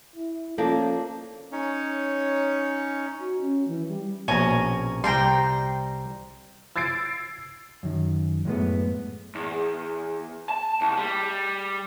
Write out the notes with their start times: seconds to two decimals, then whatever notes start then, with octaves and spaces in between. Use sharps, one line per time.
0.16 E4
0.58 F3 A#3 C#4 D4 A4
1.52 C#4 D#4 C#5
3.18 F#4
3.41 C#4
3.68 E3
3.88 G3
4.28 A#1 B2 C#4 G#5 A#5
5.04 C2 G3 G5 A#5 C6
6.76 E6 G#6 A6 C7 D7
7.83 F#2 D#3
8.45 F#2 A2 G#3 A3 B3
9.35 E2
10.49 A5
10.81 C2
10.98 G3